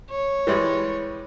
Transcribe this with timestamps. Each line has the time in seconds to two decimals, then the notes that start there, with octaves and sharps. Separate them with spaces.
0.11 C#5
0.47 E3 G3 G#3